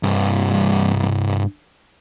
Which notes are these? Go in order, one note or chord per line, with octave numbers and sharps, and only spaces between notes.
C2 G2